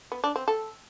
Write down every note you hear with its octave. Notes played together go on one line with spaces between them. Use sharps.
B3
D4
C4
A4